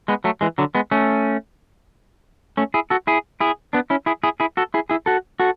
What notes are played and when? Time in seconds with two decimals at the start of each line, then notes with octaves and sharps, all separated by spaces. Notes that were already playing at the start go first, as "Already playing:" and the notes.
0.08 G#3 B3
0.24 F#3 A3
0.41 E3 G#3
0.58 D3 F#3
0.75 G#3 B3
0.91 A3 C#4
2.57 A3 C#4
2.74 E4 G#4
2.90 F#4 A4
3.07 E4 G#4
3.40 E4 G#4
3.73 B3 D4
3.90 C#4 E4
4.06 E4 G#4
4.23 E4 G#4
4.40 E4 G#4
4.57 F#4 A4
4.74 E4 G#4
4.90 E4 G#4
5.06 F#4 A4
5.40 F#4 A4